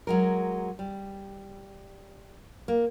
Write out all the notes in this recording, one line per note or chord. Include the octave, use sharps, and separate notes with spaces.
F#3 G#3 A#4
G3
A#3